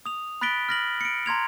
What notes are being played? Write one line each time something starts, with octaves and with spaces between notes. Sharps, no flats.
D#6 F7
B5 F#6 A6 B6 D7 G7
F6 A#6 F#7
C#7 D7
A#5 C6 G#6 F7